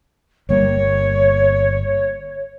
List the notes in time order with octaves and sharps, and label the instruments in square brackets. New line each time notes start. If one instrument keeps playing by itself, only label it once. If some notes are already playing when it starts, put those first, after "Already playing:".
[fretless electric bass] G1 G3 A#3 [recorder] C#5